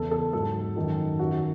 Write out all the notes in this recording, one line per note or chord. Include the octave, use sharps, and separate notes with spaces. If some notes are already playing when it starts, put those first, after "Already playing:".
Already playing: E2 C#3 E3 A4
A4
G#2 F#3 A4
F#2 D#3 F#3
F#2 D#3 F#3 F#4